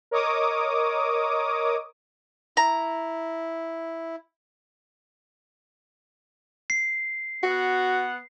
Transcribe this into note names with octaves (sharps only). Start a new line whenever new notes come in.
A#4 C#5 D#5 D6 D#6
E4 A#5
C7
B3 F#4 F#5